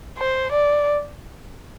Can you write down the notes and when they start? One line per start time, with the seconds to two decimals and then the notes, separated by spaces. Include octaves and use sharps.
0.18 C5
0.52 D5